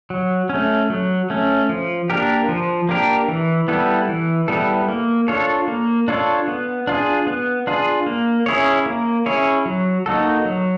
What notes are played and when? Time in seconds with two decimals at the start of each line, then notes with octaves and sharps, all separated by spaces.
0.10 F#3
0.49 A3 C#4
0.90 F#3
1.30 A3 C#4
1.69 F3
2.10 A#3 D4 G4 A#4
2.49 F3
2.89 A#3 D4 G4 A#4
3.28 E3
3.68 G3 B3 E4 A4
4.09 E3
4.48 G3 B3 E4 A4
4.88 A#3
5.28 D4 F4 A4 C#5
5.68 A#3
6.08 D4 F4 A4 C#5
6.48 B3
6.87 D4 F4 G#4
7.27 B3
7.67 D4 F4 G#4
8.06 A#3
8.46 C#4 E4 G#4 C#5
8.86 A#3
9.26 C#4 E4 G#4 C#5
9.66 F#3
10.06 A#3 D#4 F#4 A4
10.45 F#3